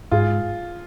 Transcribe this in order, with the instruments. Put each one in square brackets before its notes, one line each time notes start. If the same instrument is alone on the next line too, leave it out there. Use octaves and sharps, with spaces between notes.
[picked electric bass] G#2 [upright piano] F4 G#4